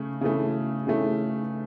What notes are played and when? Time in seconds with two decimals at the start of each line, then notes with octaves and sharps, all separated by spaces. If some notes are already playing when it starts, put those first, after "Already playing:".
Already playing: C#3 A3
0.21 C#3 E3 A3
0.87 C#3 E3 A3